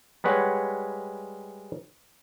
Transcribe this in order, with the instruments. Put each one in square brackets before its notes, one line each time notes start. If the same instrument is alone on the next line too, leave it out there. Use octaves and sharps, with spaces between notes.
[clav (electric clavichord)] G3 G#3 B4 C#5 F#5